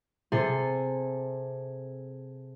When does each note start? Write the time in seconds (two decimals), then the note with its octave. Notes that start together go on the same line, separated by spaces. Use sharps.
0.32 C3 G#4 A4 G#5